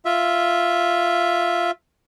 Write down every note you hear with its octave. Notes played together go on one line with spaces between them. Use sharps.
F4 E5